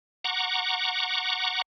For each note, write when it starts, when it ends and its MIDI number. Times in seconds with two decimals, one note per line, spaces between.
0.24 1.62 78
0.24 1.62 82
0.24 1.62 85
0.24 1.62 86